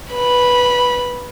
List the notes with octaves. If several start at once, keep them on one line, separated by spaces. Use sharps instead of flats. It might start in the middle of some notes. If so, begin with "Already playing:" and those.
B4 B5